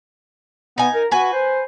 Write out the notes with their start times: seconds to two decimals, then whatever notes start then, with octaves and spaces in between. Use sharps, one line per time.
0.78 B3 D#4 G#5
0.94 A#4
1.11 F#4 B4 G#5
1.33 C5